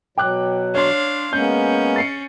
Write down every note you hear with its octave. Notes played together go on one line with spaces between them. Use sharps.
B2 F#3 G5 D6 F#6
D4 C#5 F5 C6
G#3 A#3 B3 C#4 G6
A6 C7 C#7